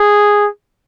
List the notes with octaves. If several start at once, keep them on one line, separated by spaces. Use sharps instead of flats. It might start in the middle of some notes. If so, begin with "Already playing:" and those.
Already playing: G#4